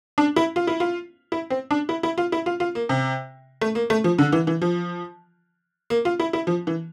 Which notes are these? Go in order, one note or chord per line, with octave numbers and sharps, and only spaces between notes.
D4
E4
F4
E4
F4
E4
C4
D4
E4
E4
F4
E4
F4
F4
A#3
C3
A3
A#3
A3
F3
D3
E3
E3
F3
A#3
F4
E4
E4
F3
E3